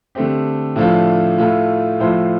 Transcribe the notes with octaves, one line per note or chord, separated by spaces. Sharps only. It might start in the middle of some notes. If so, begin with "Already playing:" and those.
D3 A3 C4 G4
A2 F3 A3 D4 F4
A2 A3 F4
A2 F3 A3 F4 C5